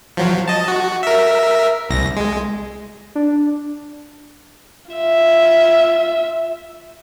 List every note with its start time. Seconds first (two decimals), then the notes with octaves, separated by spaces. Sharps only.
0.17 F3 F#3
0.48 D#5 A5
0.68 F#4
1.03 A#4 E5
1.90 C2 A#6
2.17 G#3
3.15 D4
4.92 F4 E5